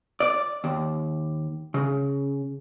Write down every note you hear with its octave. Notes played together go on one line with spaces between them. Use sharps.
D5
D#2
C#3